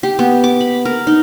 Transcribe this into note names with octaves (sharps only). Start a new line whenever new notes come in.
G4
B3
D6
B5
A#4
D#4